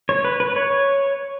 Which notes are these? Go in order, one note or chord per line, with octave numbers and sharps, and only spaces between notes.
C#5
B4
B4
C#5